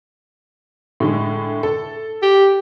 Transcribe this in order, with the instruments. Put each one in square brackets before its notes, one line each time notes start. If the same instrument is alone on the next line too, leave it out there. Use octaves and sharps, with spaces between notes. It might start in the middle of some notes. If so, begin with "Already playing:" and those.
[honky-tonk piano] A2 D3 G#3
A4
[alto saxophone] G4